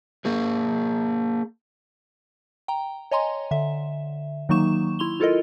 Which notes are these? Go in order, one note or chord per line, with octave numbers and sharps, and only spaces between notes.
A#3 G#4 A#4
G5 A#5
C#5 D#5 G#5 A#5 C6
D3 E5
D#3 F#3 A#3 D#4 C#6 E7
E4 C6 F7 G7
E4 F4 A4 A#4 D#5